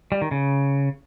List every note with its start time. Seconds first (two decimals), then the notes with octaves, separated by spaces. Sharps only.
0.12 G3
0.22 D#3
0.31 C#3